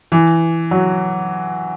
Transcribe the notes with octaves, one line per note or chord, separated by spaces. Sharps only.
E3
F#3